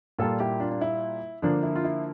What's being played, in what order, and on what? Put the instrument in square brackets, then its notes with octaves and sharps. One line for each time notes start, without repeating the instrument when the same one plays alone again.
[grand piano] A#2 G3 A#3 F4 A4
E4 G4
D4 F4
D4
E4
D3 F3 A#3 D4
E4
F4
E4